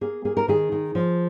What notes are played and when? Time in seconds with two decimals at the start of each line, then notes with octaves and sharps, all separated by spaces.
0.01 A#3 G#4
0.25 A#3 G#4
0.37 A#4
0.48 D#3 G#4
0.72 D#3
0.95 F3